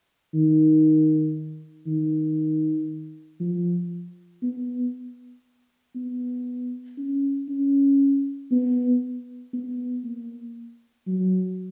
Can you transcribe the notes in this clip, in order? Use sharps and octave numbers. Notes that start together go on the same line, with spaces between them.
D#3
D#3
F3
B3
B3
C#4
C#4
B3
B3
A#3
F#3